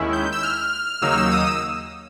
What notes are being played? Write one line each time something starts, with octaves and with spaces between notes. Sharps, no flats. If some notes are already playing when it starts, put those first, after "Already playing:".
Already playing: D#2 D#3 G#3 C#4 E4
G6
E6
F6
D#2 C#3 F#3 A#3 D#4 E6
F6
E6
D#6
E6